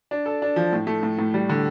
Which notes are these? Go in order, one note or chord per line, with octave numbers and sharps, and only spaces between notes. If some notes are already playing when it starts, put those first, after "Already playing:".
D4
A4
D4
F3
A2
A3
A2
A2
G3
D3